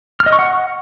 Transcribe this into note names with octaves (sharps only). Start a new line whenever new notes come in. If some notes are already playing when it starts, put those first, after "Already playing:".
F6
D#5
C#6
F#5